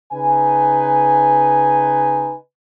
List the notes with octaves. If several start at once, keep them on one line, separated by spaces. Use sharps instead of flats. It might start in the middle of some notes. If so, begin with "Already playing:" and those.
C#3 D#4 B4 G#5